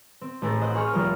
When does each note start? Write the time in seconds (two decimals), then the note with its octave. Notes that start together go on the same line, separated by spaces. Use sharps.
0.21 C4
0.42 A1 A3 G#4 A#4 G#5 A6
0.61 C5 D#5 F#5 F#6 G6
0.75 G#4 C#5 D#5 C#6 F6
0.92 F1 F3 G3 A#4 F6